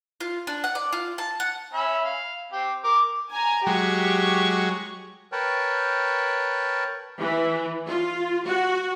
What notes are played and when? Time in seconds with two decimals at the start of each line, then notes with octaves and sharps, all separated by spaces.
0.20 F4
0.47 D4
0.64 F#5
0.75 D5
0.93 F4
1.18 A5
1.40 F#5
1.73 C#4 E5 B5
2.04 F5
2.52 C4 G4
2.84 A#4 D6
3.30 G#5 A#5
3.67 F#3 G#3 G4 C#6
5.32 A#4 B4 C#5 G5 A5
7.20 E3
7.87 F4
8.46 F#4